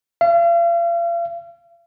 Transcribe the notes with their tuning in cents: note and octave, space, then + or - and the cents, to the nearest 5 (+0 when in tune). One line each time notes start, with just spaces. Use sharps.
F5 -40